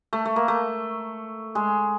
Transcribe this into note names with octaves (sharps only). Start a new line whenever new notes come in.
A3
A3
A#3
A3
G#3